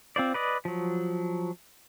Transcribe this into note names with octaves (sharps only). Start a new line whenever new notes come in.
C4 F4 C5 D5
B4 D5 D#5
F3 F#3